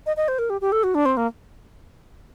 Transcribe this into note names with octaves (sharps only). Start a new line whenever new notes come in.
D#5
D#5
C5
A#4
G4
G4
A4
F#4
D4
C4
A#3